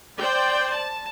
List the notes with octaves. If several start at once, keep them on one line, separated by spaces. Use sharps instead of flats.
C5 D5 G5
A5